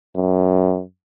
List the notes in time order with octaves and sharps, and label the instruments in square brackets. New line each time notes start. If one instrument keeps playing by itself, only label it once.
[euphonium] F#2